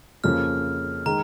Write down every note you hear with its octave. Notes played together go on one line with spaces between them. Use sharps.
F2 C#3 F3 A#3 C#4 F6
D#3 G#3 A#5